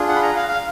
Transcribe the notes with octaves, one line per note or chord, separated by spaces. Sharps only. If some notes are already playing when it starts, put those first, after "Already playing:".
Already playing: D4 F4 G#4
F#5
B5
A#5
F5
F5